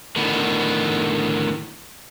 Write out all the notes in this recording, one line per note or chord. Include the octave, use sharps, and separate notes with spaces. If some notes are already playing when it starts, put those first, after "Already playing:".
A2 D3 D#3 B3